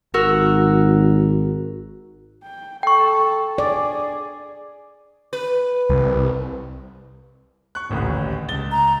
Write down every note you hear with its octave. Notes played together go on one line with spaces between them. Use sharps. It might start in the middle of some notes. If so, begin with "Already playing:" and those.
G#1 F#4 A#4 E6
G5
A4 G5 C#6
G#4 D5
B4
C2
C#6 F#6
D#1 A1 D2
C#2 A6 G7
A#5